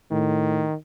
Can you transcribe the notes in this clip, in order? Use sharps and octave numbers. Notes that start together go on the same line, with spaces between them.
A2 D#3